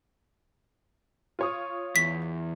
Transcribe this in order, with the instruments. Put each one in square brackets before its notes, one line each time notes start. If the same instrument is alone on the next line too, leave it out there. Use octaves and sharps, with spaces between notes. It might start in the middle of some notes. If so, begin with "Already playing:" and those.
[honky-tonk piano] F4 C#5 D#6
[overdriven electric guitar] E2 [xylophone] B6